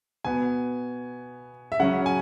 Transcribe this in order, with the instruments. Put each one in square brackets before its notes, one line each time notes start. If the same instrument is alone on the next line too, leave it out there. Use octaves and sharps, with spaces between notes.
[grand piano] B2 B3 G#5
E5
C#3 F#3 C#4 F#5
G#5